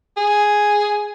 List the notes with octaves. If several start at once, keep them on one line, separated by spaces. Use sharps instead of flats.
G#4